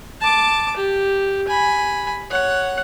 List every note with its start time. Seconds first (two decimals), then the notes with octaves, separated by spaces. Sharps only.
0.21 A5 D6
0.77 G4
1.48 G#5 B5
2.31 C#5 F#5